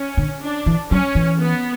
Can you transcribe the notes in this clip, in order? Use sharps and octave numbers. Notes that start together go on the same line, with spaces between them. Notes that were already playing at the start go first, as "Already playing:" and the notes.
Already playing: C#4
D3
D4
E3
F#3 C#4
E3
B3